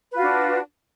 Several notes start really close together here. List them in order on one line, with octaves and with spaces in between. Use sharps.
B4 F4 F#4 D4